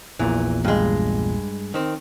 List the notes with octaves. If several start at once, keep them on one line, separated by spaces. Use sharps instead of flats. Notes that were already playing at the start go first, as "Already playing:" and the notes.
A#1 E2 A#2 E3
G2 G#3
D#3 C4